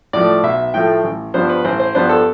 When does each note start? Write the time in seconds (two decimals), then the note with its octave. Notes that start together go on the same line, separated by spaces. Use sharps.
0.13 A2 F3 A3 D5
0.43 B1 E5
0.74 A2 F3 A3 G5
1.04 A1
1.34 G2 F3 B3 D4 C5
1.49 B4
1.65 A1 C5
1.80 C5
1.95 G2 F3 B3 D4 C5
2.09 A4